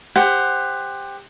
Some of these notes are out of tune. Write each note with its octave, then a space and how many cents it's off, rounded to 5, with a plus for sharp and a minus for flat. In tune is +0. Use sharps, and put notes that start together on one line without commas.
G4 +20 C5 +0 F#5 +10